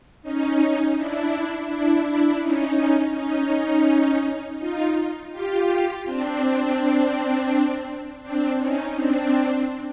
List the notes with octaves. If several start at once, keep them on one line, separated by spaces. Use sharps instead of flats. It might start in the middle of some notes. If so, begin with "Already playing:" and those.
C#4 D#4
D4 E4
D4 E4
D4 E4
C#4 D#4
C#4 D#4
D#4 F4
F4 G4
C4 D4
C4 D4
C#4 D#4
C4 D4